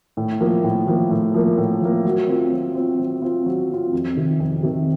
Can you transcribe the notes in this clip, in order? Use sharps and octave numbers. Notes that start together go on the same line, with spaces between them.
A2
F3 A#3
A2
F3 A#3
A2
F3 A#3
A2
F3 A#3
F#3
C4 F4
F#3
C4 F4
F#3
C4 F4
F#3
C4 F4
F2
C3 D#3
F2
C3 D#3